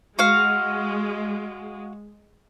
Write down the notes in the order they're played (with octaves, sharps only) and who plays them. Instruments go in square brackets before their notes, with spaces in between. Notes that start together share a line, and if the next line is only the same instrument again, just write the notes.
[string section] G#3 [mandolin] F#4 F5